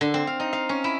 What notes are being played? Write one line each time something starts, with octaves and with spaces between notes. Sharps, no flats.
D3
C4
F5
D#4
F5
C#4
E4